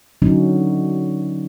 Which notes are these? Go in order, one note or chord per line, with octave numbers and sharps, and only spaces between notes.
D3 F#3 C#4 D#4